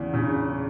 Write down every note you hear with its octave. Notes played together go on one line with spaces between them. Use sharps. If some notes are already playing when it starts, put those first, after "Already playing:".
Already playing: E2 C#3
C#3